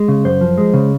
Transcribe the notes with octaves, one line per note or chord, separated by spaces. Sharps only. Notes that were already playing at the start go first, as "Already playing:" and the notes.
Already playing: G#3
C#3
F#2 C5
F3
G#3
C#3